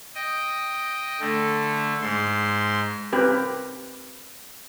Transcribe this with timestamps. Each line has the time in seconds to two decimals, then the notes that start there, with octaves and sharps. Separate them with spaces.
0.15 D#5 G5
1.20 D3 A3
2.02 G#2 C6
3.13 C4 G4 A#4 B4